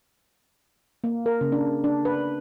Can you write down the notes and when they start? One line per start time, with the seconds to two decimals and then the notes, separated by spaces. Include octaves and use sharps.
1.04 A#3
1.26 A#4
1.41 C#3
1.52 D4
1.84 D4
2.05 B4